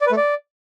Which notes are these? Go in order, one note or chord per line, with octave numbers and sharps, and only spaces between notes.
D5
B4
A3
D5